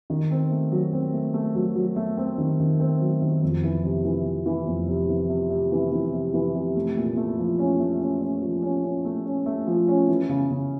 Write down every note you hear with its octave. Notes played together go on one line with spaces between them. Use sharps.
D#3
C4
A3
F#3
C4
A3
A3
F#3
F#3
A3
C4
D#3
D#3
C4
F#3
D#3
F2
E3
C3
E3
C3
E3
F2
C3
E3
C3
C3
E3
E3
C3
E3
C3
A3
A#2
A3
F3
C#4
A3
C#4
C#4
F3
C#4
C#4
A3
C#4
A3
F3
C#4
E3
C#3
C#3